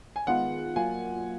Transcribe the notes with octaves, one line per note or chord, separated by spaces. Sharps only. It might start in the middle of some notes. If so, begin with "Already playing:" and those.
G#5
D#3 G#3 B3 F4 F#5
F#3 A#3 F4 G#5